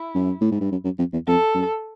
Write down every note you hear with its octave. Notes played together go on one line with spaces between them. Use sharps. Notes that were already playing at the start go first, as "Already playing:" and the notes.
Already playing: E4
F#2
A2
G#2
G2
F#2
F#2
F2
E2
F2 A4
F#2